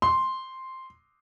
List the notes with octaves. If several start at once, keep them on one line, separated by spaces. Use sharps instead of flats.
C6